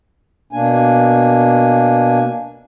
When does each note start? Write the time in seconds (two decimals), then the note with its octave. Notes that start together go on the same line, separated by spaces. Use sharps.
0.53 B2 A#3 D4 G#5